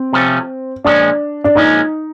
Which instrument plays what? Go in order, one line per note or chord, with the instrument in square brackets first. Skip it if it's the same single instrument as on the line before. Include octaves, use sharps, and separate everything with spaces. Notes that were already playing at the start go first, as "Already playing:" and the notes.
Already playing: [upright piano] C4
[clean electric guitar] C3 F3 A3 C#4
[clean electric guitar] A#2 F3 G#3 C#4 [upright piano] D4
[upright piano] D4
[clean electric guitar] A#2 F3 G#3 C#4 [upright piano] D#4